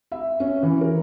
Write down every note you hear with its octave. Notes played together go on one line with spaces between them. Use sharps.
E5
C#4
E3
A#4